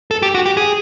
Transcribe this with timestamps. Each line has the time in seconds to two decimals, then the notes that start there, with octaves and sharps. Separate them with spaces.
0.11 A4
0.22 G4
0.35 F#4
0.46 G4
0.57 G#4